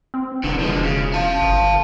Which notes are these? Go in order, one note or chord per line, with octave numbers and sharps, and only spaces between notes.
C4
E1 D3 D#3
F3 G#3
C#3
F5 A5
G1